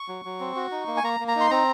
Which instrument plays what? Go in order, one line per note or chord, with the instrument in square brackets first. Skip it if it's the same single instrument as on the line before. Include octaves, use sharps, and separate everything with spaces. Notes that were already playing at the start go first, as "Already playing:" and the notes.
Already playing: [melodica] C#6
F#3
F#3
C4
F#4
D#4
A#3
G#5
A#3 A#5
A#3
A#5
D#4 C6
C4 A#5